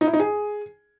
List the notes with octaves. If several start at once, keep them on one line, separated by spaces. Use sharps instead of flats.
D#4
E4
D#4
G#4